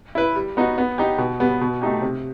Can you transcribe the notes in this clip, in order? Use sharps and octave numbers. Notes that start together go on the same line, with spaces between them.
E4 B4
G3
B3 D#4 F#4
B3
D#4 G4
B2
G3 B3
B2
A3 D#4 G4
C3